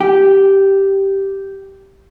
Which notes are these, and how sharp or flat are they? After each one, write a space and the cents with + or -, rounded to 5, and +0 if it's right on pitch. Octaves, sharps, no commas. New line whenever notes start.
G4 -5